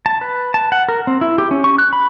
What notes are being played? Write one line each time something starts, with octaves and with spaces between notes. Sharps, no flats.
A5
B4
A5
F#5
A#4
C4
E4
G4
C#4
C#6
F#6
B5